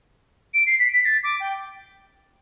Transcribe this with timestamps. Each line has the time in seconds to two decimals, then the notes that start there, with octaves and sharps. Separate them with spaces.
0.54 D7
0.67 C7
0.79 B6
0.93 B6
1.05 A6
1.24 D6
1.40 G5